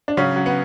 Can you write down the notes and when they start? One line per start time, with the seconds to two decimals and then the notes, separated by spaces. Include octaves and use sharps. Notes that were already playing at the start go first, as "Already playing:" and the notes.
0.08 D4
0.17 C#3 F#3 C#4
0.36 F#3
0.46 B3